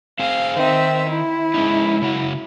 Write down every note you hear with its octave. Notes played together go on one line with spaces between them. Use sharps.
C4 G#4 C5 F5
D#3 C4 D#4 E5
E4
G#3 C#4 D#4
C#3 C#4 F#4